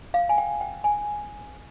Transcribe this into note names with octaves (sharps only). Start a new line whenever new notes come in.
F5
G#5
G5
G5
G#5